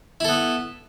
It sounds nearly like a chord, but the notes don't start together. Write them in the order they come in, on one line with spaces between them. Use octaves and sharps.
E4 A4 B3